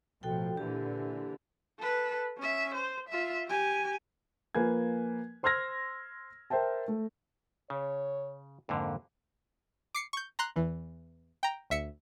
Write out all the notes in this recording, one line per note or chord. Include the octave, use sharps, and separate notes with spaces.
A1 B2 F3 F#4 A4 G5
A#2 D3 E3 G4
A4 B4
C#4 E5
C5
F4 E5
G4 G#5
F3 A#3 B4 G#5 G#6
C5 C6 E6 F6 G#6 A#6
A#4 C5 E5 G5 A5
A3
C#3 C#5
F2 G#2 D3 A#3
D6 C7 C#7
C#6 G6
A#5 C6 F#6
E2 E3
G5 A#5
D2 E5 C#7